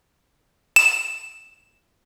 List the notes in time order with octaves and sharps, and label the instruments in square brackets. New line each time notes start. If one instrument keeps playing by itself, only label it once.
[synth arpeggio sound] E7